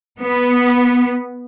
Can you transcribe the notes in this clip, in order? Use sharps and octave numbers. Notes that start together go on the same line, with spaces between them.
B3